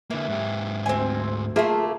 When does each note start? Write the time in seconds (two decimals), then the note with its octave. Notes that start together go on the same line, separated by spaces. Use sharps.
0.10 D3 E3 A#3
0.28 G#2 G4
0.86 D2 C4 G#5
1.56 A3 A#3 F4 G#4 E5